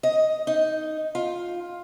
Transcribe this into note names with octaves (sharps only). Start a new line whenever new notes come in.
D#5
D#4
F4